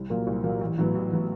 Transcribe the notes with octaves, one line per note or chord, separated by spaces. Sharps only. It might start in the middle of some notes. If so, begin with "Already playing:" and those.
Already playing: C2
A#2 F#3 A#3
C2
A#2 F#3 A#3
A1
A2 F#3 B3
A1
A2 F#3 B3